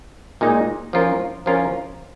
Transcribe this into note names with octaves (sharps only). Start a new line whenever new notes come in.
A#2 G#3 D#4
F3 C#4 F4 A#4
F3 C#4 F4 A#4